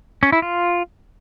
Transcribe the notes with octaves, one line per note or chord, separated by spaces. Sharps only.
C#4
E4
F4